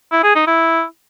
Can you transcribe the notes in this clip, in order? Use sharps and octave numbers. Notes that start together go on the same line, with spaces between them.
E4
G#4
D#4
E4